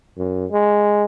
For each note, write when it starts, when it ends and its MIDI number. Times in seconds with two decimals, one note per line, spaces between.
0.18 0.46 42
0.52 1.04 56